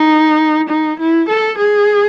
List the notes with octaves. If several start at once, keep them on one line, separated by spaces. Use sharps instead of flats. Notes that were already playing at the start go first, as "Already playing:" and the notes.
Already playing: D#4
D#4
E4
A4
G#4